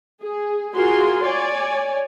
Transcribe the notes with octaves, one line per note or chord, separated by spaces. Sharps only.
G#4
F4 F#4 G#4 A#4 G#5 C6
C#5 D5 G#5